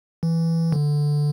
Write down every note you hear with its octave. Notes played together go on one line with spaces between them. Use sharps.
E3
D3